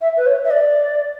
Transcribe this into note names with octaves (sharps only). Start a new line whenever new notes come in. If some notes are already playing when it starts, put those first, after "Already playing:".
E5
B4
C#5
E5
D5